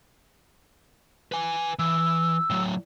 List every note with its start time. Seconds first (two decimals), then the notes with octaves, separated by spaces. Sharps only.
1.32 B4 G#5
1.79 E3 E6
2.50 A2 F#3